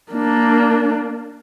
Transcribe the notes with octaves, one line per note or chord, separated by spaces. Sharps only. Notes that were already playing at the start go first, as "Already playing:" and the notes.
A#3 D4